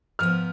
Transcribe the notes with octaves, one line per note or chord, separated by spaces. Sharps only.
G#2 F3 B3 F6